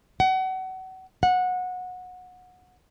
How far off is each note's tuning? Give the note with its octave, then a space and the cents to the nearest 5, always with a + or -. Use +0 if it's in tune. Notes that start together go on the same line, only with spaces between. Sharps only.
F#5 +30
F#5 -20